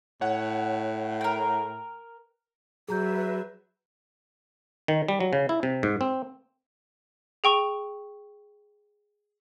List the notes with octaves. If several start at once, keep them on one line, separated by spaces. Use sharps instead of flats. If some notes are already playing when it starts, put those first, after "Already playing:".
A2 C#5 F#5
A#4 G5
F#3 G#4 B4 E5 A#5 G6
D#3
G3
F#3
C#3
E4
C3
G#2
C4
G#4 G5 C#6 F7